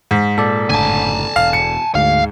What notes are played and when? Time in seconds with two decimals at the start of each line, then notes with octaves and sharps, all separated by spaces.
0.11 G#2
0.38 A#2 A4 D5
0.70 F#1 A2 D3 G#5 A5
1.36 E1 F5
1.53 C#7
1.95 D2 G#2 F5